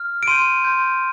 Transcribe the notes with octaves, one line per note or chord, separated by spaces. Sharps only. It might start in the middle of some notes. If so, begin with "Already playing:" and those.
Already playing: F6
D7
C6 G6 D#7
C6 G6